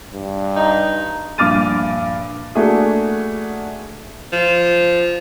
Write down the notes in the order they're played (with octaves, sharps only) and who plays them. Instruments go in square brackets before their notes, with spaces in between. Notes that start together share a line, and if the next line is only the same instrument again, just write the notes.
[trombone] G2
[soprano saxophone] D#4
[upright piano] A#1 G2 D6 F6 A6 D#7
A3 A#3 D4 F#4 G#4
[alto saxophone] F3